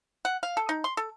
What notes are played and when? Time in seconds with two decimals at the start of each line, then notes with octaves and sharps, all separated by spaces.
0.25 F#5
0.43 F5
0.57 A4
0.69 D#4
0.84 C6
0.97 A4